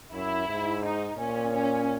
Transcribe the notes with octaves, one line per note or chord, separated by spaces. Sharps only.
F#2 E4
G#2
D#4
A#2 C#4
C#4